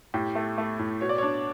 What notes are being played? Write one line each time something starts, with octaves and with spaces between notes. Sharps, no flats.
A2 G4
A3
A3
A2
B2 C#5
D5
D4 C#5